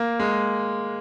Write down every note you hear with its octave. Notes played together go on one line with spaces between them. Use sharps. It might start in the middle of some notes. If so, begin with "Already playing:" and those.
Already playing: A#3
G#3